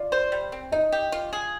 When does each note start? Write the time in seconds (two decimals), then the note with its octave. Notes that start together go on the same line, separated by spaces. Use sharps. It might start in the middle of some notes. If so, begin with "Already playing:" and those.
Already playing: F4 D5
0.12 C5
0.32 G3
0.52 C4
0.72 D#4 D#5
0.92 G4
1.12 F4
1.33 G#4